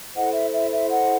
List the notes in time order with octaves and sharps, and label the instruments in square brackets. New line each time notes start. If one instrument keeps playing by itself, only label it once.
[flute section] E4 A4 C5 D#5 F#5
E5
E5
E5
D#5 F#5